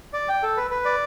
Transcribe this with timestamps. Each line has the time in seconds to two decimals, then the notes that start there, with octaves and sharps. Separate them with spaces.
0.13 D5
0.29 G5
0.43 A4
0.57 B4
0.71 B4
0.85 D5